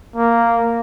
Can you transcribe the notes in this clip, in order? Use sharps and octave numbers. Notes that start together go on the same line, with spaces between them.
A#3